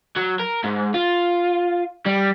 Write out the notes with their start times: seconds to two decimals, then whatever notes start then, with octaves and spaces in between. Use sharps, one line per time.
0.16 F#3
0.40 A#4
0.64 G#2
0.94 F4
2.06 G3